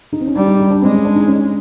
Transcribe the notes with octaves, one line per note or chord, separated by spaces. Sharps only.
D#4
C4
C#4
G3 D4
D#4
D#4
D4
G#3 C4
C#4
D4
D#4
C#4